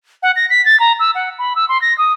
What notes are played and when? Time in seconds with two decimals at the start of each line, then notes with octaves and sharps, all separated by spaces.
0.23 F#5
0.36 A#6
0.50 B6
0.65 A6
0.80 A#5
1.00 E6
1.15 F#5
1.39 B5
1.56 E6
1.69 C6
1.82 A#6
1.98 D#6